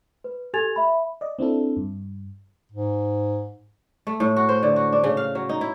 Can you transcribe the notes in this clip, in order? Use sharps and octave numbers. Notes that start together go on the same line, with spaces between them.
B4
G4 A4 G#5 G#6 A6 F7
E5 B5
D5 D#5
C4 D4 E4 A4
G2
G#2
A3
A2
F#4
C5
D3
F#4
D4
C#3
F5
F#3
D#4
E4